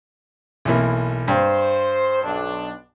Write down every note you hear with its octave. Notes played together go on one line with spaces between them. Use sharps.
B1 E3 A#3
G2 C5
B1 D4